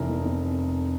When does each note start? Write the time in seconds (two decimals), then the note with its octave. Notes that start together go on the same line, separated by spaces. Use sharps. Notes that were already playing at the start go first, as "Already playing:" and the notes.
Already playing: F1 E3 A#4 A#5
0.10 F2
0.26 F2